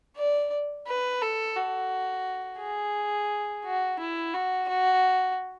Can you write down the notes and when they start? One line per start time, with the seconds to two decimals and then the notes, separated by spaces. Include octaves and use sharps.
0.17 D5
0.87 B4
1.22 A4
1.56 F#4
2.60 G#4
3.65 F#4
3.99 E4
4.34 F#4
4.68 F#4